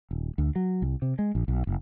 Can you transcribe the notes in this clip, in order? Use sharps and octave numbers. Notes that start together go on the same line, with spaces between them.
D#1
D2
F#3
C2
C3
G#3
A#1
B1
F#1